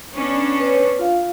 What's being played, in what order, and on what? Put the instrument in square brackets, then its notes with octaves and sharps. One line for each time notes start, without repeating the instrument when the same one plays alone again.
[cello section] B3 C#4 D4
[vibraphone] B4 C#5
F4 F5